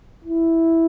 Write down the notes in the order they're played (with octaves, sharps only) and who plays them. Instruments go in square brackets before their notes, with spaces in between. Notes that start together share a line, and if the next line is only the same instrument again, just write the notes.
[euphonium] E4